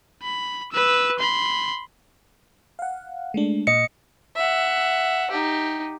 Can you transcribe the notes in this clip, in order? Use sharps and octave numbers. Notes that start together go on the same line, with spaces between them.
B5
B4 E6
B5 C6
F5 F#5
G#3 A3 D4
A#2 D#5 C#7
E5 F#5
D#4 G4